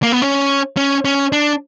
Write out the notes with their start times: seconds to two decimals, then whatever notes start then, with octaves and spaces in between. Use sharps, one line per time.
0.03 A#3
0.12 B3
0.22 C#4
0.77 C#4
1.05 C#4
1.32 D4